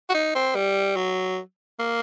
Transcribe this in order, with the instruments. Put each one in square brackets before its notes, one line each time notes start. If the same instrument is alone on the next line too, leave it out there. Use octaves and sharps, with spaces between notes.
[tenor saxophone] F#4
D#4
C4
G3
F#3
A#3